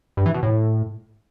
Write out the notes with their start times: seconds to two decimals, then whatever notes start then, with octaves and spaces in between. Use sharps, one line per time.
0.17 G2
0.26 E3
0.34 B2
0.43 A2